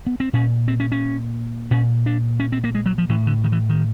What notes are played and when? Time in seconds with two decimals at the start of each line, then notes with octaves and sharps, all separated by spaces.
0.06 B3
0.20 C4
0.33 A#2 C#4
0.68 C4
0.80 C#4
0.92 C#4
1.71 A#2 C#4
2.06 D4
2.40 C#4
2.52 C4
2.64 A#3
2.75 G#3
2.86 F#3
2.98 F3
3.09 A2 E3
3.27 D3
3.44 D#3
3.52 E3
3.69 D#3